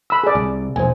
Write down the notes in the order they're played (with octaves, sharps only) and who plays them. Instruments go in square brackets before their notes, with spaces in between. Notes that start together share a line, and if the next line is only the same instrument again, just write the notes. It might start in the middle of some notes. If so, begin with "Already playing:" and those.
[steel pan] B5 E6
G#4 D5
[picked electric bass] C2
[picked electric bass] E1 A#1 [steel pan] C5 G#5